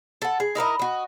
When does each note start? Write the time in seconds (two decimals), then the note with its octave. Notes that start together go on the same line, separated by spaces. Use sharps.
0.22 A4 F#5
0.40 G#4
0.55 D#4 E4 A#4 D#5
0.79 F#4 D#5